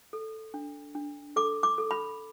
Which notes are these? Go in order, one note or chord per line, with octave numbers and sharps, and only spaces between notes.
A4
D4
D4
A4 D6
D6
A4
B5